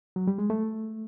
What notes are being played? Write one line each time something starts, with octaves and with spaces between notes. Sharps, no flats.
F#3
G3
G#3
A3